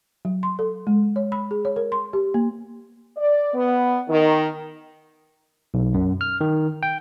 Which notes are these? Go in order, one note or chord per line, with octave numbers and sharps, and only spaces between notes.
F#3
C6
A4
G#3
C#5
B5
G#4
C#5
A#4
C6
G4
A#3
D5
B3
D#3
B1
F#2
F6
D#3
G5